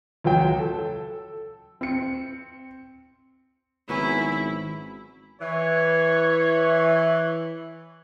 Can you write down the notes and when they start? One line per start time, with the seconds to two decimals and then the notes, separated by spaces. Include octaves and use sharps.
0.24 C#2 F#3 G5
0.59 A4
1.81 C4 C#7
3.89 G#1 F#3 B3 C#4 E4
5.41 E3 C#5